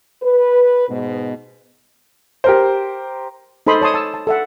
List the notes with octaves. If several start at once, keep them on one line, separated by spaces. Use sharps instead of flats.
B4
G#2 B2
G4 A#4 C5
D#4 A4 C5 B5 C6 D#6
C#5 A5 C6 D#6
A5 E6
A5
A4 E5 F#5